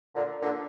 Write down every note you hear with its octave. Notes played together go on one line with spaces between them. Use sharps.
A#2 D3
A#2 D3